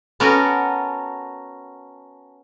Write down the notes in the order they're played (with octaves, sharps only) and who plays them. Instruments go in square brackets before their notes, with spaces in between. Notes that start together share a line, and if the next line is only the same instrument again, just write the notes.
[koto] B3 C#4 F#4 A4 A#4